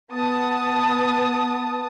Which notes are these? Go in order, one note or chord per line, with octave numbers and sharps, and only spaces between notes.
B3 A5 D#6